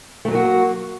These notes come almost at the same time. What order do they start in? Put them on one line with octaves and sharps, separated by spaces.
A3 F#3 A#3 F#4